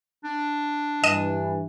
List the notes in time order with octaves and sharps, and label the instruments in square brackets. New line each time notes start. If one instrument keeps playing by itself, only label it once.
[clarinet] D4
[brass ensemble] G2 E3 [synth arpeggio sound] D#5 D#7 E7